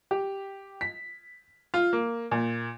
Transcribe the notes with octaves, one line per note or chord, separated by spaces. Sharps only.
G4
B6
F4
A#3
A#2